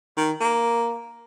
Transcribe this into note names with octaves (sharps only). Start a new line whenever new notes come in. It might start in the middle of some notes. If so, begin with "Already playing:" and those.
D#3
A#3